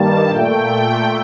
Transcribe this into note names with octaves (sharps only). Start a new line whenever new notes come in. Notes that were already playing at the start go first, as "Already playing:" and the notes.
Already playing: G2 D#3 G3 A#3 A5
A#2 A3 G5